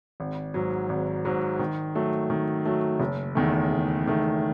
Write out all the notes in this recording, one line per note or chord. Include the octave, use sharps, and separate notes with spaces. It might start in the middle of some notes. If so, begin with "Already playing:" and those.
G#1
G#2 F#3
G#1
G#2 F#3
D#3
F#3 A3
D#3
F#3 A3
F#1
E2 D#3 A3
F#1
E2 D#3 A3